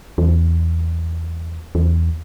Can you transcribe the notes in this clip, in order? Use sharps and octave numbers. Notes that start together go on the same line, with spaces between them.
E2
E2